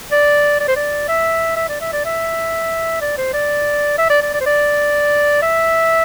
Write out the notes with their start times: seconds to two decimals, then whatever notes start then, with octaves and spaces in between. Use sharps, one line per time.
0.12 D5
0.60 D5
0.68 C5
0.76 D5
1.08 E5
1.57 E5
1.69 D5
1.81 E5
1.93 D5
2.05 E5
3.01 D5
3.18 C5
3.33 D5
3.98 E5
4.10 D5
4.23 D5
4.34 D5
4.41 C5
4.46 D5
5.42 E5